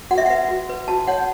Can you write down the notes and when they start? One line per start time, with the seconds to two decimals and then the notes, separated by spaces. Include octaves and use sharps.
0.11 F#4 F#5
0.18 E5
0.26 B4 F#5
0.49 F#4
0.69 B4
0.88 F#4 A5
1.08 C#5 F#5